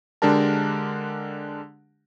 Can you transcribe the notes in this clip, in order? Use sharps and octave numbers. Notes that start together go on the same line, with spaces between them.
D3 G#3 D4 G4 A#4 A5